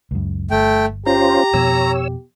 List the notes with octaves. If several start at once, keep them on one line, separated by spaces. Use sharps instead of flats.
C#2 F#2
G1 A3 G5
C#4 F4 G4 C5 A#5
F2 B2 F3 C#5 E6